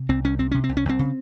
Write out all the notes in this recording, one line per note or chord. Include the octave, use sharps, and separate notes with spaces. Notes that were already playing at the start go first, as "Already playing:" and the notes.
Already playing: C3
C2 C4
C2 C#4
C3 C4
C3 C#4
C4
C2
C#4
C2 C4
C#3